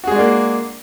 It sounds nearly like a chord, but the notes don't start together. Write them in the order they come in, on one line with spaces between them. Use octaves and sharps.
F#4 G#4 G#3 D4 A#3